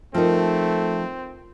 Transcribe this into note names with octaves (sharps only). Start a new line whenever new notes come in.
F3 A3 C4 D#4 F4 A#4